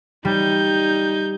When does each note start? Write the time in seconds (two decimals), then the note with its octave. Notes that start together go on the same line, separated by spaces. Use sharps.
0.25 G3 D#4 G6